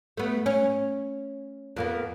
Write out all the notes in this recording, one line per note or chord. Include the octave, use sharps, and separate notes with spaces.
A3 B3
C#4
F2 A#3 B3